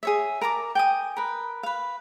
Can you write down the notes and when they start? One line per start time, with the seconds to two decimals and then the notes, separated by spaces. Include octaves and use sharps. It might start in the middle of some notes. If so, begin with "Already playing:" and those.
0.03 G#4 C#5 E5
0.41 A#4 A5 A#5 D6
0.75 G5 G#5 D#6
1.17 A#4 B4
1.63 B4 F5